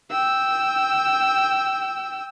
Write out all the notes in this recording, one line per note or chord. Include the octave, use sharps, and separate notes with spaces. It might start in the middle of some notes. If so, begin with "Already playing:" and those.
G5 E6